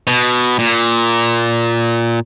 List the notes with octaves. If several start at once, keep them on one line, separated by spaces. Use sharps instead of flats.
B2
A#2